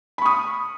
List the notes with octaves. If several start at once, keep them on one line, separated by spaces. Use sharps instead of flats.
B5 C#6 D#6